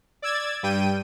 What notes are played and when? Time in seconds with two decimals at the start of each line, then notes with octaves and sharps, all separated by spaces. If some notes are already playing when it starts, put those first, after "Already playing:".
0.22 D5 E6 G#6 A6
0.63 G2 G3 G5 D#7